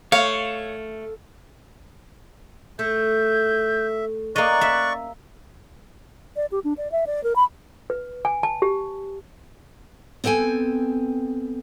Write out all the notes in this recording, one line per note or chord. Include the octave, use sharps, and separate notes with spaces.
A3 C#5 F5
A3 E5 G6
A#3 C#4 D5 D#5 C#6 F#6
E5
D5
G4
D4
D5
E5
D5
A#4
B5
B4
G#5
A5
G4
B3 C4 A4 G5 G#5